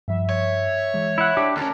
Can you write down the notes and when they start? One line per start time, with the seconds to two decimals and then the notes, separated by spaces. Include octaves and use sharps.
0.08 G2 F3 E5
0.30 C#5
0.94 E3 G#3
1.18 E4 E5 F#5
1.37 D4 G4
1.57 D2 C#4 A#4 A5 F#6